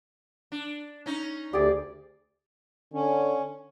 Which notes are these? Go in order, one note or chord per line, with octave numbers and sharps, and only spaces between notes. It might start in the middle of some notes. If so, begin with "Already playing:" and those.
D4
C#4 D#4
D2 G4 G#4 D5
D3 C#4